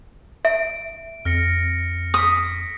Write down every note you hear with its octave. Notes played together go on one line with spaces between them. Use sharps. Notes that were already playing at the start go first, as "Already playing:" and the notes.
E5 D7
F2 F6 A#6 C#7
D#6 F6 B6